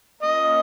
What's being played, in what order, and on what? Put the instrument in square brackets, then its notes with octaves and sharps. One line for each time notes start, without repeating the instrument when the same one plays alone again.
[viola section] A#3 C#4 F4 [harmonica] D#5